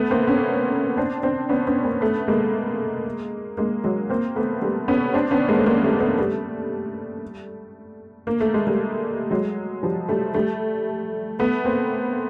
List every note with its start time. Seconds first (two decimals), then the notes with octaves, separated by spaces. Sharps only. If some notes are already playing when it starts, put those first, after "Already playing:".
Already playing: A3 B3
0.10 A#3 C4
0.27 B3 C#4
0.97 C4 D4
1.23 C4 D4
1.49 B3 C#4
1.67 B3 C#4
1.84 A#3 C4
2.01 A3 B3
2.28 G#3 A#3
3.57 G#3 A#3
3.84 F#3 G#3
4.10 A#3 C4
4.36 A3 B3
4.62 G3 A3
4.88 B3 C#4
5.14 C4 D4
5.31 B3 C#4
5.48 G#3 A#3
5.58 A3
5.66 G#3 A#3
5.83 G3 A3
6.00 A3 B3
6.18 G3 A3
8.27 A#3
8.40 A3
8.54 G#3
8.67 G3 A3
9.31 F#3 G#3
9.83 F3 G3
10.08 G3 A3
10.34 G3 A3
11.39 A3 B3
11.64 A#3 C4